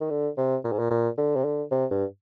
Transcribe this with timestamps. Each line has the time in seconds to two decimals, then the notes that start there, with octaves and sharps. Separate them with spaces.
0.01 D#3
0.10 D3
0.38 C3
0.64 A#2
0.72 G#2
0.79 A#2
0.90 A#2
1.18 D3
1.36 C3
1.44 D3
1.71 C3
1.91 G2